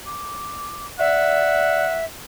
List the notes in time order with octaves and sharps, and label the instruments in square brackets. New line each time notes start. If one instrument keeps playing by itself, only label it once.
[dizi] D6
[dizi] D5 [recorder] E5 [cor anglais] F#5